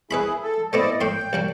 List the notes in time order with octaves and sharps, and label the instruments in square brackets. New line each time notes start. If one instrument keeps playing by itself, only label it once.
[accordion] E4 G#4 [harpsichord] B4 E5 B5
[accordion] A4
[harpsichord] A3 B3 C4 [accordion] E4 D5 D#5
[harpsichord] A2 F5 C6 [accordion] G5
[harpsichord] C2 F#3 D4